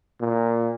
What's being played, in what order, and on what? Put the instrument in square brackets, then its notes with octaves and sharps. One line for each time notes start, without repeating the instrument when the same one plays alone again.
[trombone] A#2